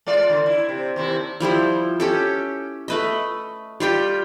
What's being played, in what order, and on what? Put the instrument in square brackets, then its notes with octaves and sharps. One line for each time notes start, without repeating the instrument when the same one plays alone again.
[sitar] G#3 F4 D5
D3
E4
C3
D#2 C3 E4
[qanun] F3 G3 E4 C5
C#4 G4 A4
A3 B4 D#5
G3 F4 G4 G5